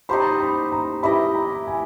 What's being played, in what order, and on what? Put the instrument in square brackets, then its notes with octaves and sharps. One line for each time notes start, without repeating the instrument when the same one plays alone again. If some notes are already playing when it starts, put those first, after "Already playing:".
[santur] D#4 G4 C5 [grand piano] B5
[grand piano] B5
B5
A#5
[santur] E4 G4 B4 D#5 [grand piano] B5
[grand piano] A#5
G#5